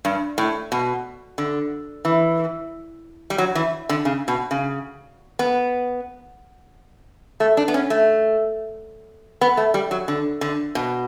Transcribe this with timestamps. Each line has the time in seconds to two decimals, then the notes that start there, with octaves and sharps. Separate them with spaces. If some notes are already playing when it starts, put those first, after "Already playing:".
0.05 G2
0.38 A2
0.72 B2
1.38 D3
2.05 E3
3.30 G3
3.38 F#3
3.55 E3
3.89 D3
4.05 C#3
4.28 B2
4.51 C#3
5.39 B3
7.40 A3
7.57 D4
7.68 B3
7.74 C#4
7.90 A3
9.41 B3
9.57 A3
9.74 G3
9.91 F#3
10.08 D3
10.41 D3
10.75 B2